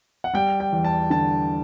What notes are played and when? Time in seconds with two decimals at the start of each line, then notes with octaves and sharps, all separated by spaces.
0.24 F#5
0.34 G3 G5
0.60 G5
0.72 E2
0.84 A5
1.10 D3 A5